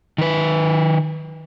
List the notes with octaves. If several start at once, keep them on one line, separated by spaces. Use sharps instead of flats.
D#3 B4